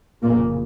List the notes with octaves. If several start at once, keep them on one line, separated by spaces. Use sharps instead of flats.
F1 F2 A#2 C#3 A#3